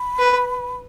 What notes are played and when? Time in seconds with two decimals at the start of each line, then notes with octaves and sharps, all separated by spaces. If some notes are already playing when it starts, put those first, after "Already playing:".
Already playing: B5
0.19 B4